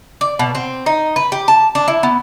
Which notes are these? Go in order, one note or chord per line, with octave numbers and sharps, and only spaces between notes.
D5
B2
C4
D#4
B4
G4
A5
D4
E4
B3